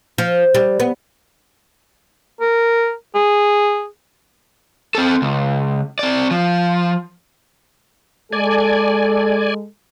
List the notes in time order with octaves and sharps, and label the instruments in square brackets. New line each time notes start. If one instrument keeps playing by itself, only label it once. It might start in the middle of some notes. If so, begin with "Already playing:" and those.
[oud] F3
G3
B3
[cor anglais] A#4
G#4
[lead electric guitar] C4 A4
C#2
C4 D5
F3
[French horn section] G#3 A4 [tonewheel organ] D5 G#5